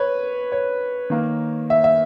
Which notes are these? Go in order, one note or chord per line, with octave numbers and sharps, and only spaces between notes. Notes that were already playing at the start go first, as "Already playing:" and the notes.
Already playing: B4 C#5
C#5
D#3 A#3
E5
E5